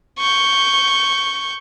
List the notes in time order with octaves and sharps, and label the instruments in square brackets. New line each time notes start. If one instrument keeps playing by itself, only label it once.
[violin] C#6 G6